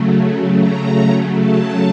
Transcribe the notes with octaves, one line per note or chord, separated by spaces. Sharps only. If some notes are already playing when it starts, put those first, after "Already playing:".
Already playing: C#3 F#3 A3
A#5
A5